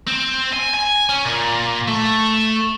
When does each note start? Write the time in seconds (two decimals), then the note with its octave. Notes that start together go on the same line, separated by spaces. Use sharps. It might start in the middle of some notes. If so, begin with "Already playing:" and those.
0.07 C4
0.53 G#5
0.74 G#5
1.09 C#4
1.25 A#2
1.88 A3